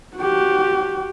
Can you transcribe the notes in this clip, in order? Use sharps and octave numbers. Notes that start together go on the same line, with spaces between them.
F#4 G4